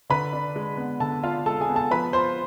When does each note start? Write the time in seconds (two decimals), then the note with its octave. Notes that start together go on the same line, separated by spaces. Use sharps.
0.10 D3 B4 B5
0.33 D4
0.56 G#3
0.77 B3
1.00 D3 A4 A5
1.23 D4 F4 F5
1.46 G#3 A4 A5
1.61 G#4 G#5
1.69 B3
1.75 A4 A5
1.91 F3 B4 B5
2.13 F4 C5 C6